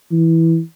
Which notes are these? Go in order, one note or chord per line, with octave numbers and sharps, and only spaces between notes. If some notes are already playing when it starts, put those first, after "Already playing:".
E3